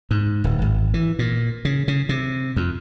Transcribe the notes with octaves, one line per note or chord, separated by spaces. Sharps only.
G#2
D1
G#1
E3
A#2
C#3
C#3
C3
F2